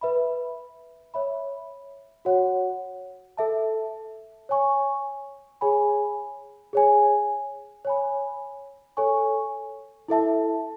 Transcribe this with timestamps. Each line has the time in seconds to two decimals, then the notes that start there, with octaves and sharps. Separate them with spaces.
0.01 B4 E5 B5
1.14 C#5 E5 B5
2.25 F#4 C#5 F#5
3.37 A4 E5 A5
4.49 C#5 G#5 C#6
5.61 G#4 C#5 G#5 B5
6.73 G#4 C#5 G#5
7.85 C#5 G#5 B5
8.97 A4 C#5 G#5 C#6
10.08 E4 A4 E5 A5